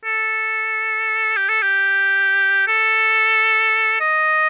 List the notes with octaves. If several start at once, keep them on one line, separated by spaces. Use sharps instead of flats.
A4
G4
A4
G4
A4
D#5